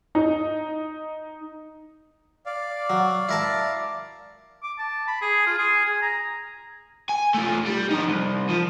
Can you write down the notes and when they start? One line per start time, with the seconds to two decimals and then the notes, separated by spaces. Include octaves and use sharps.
0.15 D#4
2.46 D5 F5
2.90 F#3
3.29 E4 A#4 A5
4.63 D6
4.79 A5
5.07 B5
5.22 G#4
5.46 F4
5.58 G#4
5.85 G#5
6.02 A#5
7.09 G#5
7.34 A3 F4
7.66 G3
7.91 F3 D#4
8.10 C2
8.50 F3